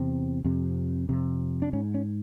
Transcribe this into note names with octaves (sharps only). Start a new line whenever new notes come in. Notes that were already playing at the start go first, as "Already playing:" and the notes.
Already playing: E2 C3 C4
F2 C3
F2 C3
D4
G#2 C#4
C#4